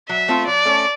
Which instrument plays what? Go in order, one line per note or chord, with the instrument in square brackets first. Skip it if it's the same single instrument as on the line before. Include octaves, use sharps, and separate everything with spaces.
[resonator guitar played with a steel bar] F#3 [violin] E5
[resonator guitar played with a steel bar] A3 C4 F4
[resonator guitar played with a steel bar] F#3 [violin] D5
[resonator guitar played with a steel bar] A3 C#4